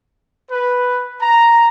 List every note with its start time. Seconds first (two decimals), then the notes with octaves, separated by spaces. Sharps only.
0.50 B4
1.20 A#5